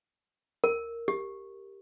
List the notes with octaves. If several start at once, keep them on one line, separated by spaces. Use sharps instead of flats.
A#4
G4